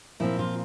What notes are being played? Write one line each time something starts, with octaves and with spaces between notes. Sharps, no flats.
A#2 F3 C4 E4
F4